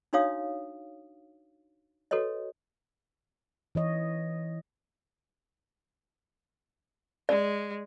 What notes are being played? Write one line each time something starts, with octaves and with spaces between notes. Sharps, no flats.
D4 D#4 F#4 C#5 F5 D#6
F#4 A4 B4 C#5 D#5
E3 C#5 D#5
G#3 D5